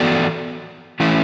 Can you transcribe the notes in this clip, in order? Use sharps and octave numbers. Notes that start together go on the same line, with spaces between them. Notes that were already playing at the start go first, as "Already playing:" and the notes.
Already playing: E3 B3 F#4 A4 D5
E3 A3 C#4 E4